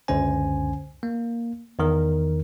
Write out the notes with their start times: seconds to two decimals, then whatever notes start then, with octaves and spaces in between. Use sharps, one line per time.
0.08 C#2 F#2 D3 C#4 C5 G#5
1.03 A#3
1.79 E2 D#3 A#4